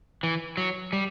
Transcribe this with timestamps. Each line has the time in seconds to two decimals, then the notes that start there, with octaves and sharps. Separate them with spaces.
0.23 E3
0.57 F#3
0.93 G3